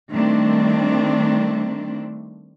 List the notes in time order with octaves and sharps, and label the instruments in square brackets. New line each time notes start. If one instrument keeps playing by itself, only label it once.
[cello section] D#3 G3 A3 C4 D4